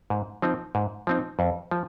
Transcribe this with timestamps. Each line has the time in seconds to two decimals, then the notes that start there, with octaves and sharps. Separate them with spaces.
0.10 G#2
0.42 F3 C4 D#4
0.75 G#2
1.07 F3 C4 D#4
1.39 F2
1.71 F3